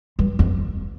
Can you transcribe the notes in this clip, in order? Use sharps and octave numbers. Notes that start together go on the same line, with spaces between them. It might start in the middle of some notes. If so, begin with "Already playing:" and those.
G2
F2